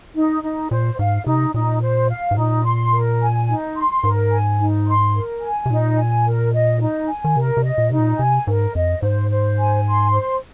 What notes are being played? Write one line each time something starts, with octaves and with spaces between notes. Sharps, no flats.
D#4
D#4
A#2 C5
G#2 F5
C3 D#4
A#2 D#4
C5
F5
G#2
A#2 D#4
C6
A#4
G#5
D#4
C6
G#2 A#4
G#5
D#4
C6
A#4
G#5
C3
A#2 D#4
G#5
A#4
D#5
D#4
G#5
D#3
C3 A#4
C3
D#5
A#2
C3 D#4
A#2
C3 G#5
G#2 A#4
F2 D#5
G#2 C5
C5
G#5
C6
C5